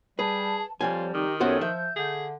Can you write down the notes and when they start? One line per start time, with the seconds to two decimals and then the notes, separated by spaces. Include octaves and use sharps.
0.19 G3 G#4 B4 A5
0.81 F2 F3 G3 F4 C#5 G#5
1.14 D#3 D#4 G4
1.40 F#2 B3 F#4 G4 A4 C5 C#5
1.61 F3 E5 G6
1.96 D3 G#4